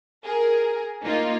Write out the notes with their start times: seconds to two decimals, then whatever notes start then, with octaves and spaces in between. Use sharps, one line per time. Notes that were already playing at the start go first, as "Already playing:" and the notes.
0.24 G#4 A#4
1.03 A#3 D#4 F4